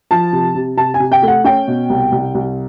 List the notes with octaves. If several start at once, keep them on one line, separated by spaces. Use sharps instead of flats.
F3 A5
C3
C3
C3 A5
G#5
C3
G5
A3
F#5
C#4 G5
B2
C2
C2
C2